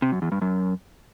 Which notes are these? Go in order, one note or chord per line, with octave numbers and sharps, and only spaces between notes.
C3
F#2
E2
G2
F#2